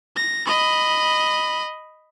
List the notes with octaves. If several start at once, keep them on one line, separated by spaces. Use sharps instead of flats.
A#6
D#5 B5